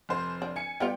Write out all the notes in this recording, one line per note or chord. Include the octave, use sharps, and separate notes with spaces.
F1 C5
D4
G#5 C#7
G3 B3 F4 G5